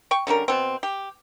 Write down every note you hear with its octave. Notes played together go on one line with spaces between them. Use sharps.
G5 C#6
D3 G3 C#4 A#4
B2 C4
G4